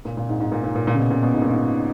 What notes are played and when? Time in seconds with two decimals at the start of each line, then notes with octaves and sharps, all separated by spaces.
0.05 A#2
0.17 A#2
0.29 G#2
0.40 G#2
0.52 A#2
0.63 A#2
0.75 A#2
0.87 A#2
0.94 C#3
0.99 B2
1.11 A#2
1.23 B2
1.34 G#2
1.42 A#2
1.50 G#2